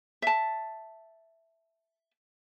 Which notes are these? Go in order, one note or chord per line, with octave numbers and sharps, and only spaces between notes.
E5 A5